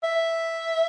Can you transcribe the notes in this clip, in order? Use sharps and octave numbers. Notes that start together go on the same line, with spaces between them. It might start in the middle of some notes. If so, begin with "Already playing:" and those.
E5